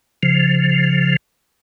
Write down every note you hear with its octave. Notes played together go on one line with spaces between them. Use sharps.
C#3 F3